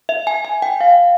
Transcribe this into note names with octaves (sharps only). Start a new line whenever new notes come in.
E5
G#5
G#5
G5
F5